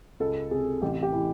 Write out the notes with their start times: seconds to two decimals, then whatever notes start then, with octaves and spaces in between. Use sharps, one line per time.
0.20 C#2 A4
0.51 C3 G#4
0.82 A1 G4
1.03 G4
1.12 E3